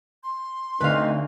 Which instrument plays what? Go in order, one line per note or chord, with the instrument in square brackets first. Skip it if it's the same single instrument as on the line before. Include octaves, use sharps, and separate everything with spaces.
[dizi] C6
[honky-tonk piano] D2 D4 C7 [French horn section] A3 C4 D#4 [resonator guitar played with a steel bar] B4 F5